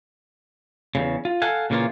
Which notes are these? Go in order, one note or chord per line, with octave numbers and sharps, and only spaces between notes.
E2 A#2 C#3
F4
A4 F5 F#5 G#5
A#2 C#3 E3 A#3 F4